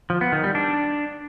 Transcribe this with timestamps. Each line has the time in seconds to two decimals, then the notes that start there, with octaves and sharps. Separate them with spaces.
0.10 F3
0.21 B3
0.32 D#3
0.44 G3
0.55 D4